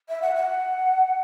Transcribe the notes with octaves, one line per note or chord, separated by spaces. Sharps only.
E5
F#5
F#5